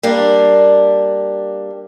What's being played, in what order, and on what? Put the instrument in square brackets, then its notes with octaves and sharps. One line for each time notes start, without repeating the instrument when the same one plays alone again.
[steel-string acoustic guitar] G3 A#3 D4